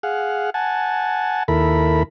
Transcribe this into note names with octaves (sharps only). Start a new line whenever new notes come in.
G#4 F5 F#5
F#5 G#5 A5
D#2 E4 A4 A#4 B5